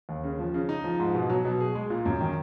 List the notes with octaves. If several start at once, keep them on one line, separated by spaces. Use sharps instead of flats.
D#2
C#3
F3
C#3
D#4
F3
G#2
B2
F#3
B2
G#4
G#3
A#2
F#2
D#3